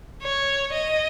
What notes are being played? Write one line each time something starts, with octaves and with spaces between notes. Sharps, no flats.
C#5
D#5